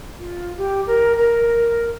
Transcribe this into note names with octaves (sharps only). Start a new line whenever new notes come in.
F4
G4
A#4
A#4